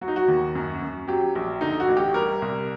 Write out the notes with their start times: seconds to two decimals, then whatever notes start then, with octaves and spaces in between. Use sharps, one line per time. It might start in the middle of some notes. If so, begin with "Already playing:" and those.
0.01 F#3 F#4
0.08 D#4
0.16 F#4
0.28 D#2
0.55 F#2
0.82 F#2
1.07 F#3 G4
1.35 A#1
1.61 D3 D#4
1.80 F#4
1.88 A1
1.97 G4
2.14 G3 A#4
2.42 C2